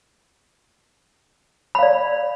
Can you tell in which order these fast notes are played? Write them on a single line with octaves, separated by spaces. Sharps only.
B5 F5 D5